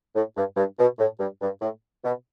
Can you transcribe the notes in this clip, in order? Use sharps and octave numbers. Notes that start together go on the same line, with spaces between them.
A2
G2
G2
B2
A2
G2
G2
A2
B2